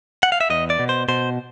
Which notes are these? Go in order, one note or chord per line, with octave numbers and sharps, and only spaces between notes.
F#5
F5
E5
E2 D#5
D5
B2
C5
B2 C5